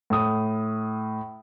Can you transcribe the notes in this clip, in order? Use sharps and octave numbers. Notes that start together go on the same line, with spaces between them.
A2 D#6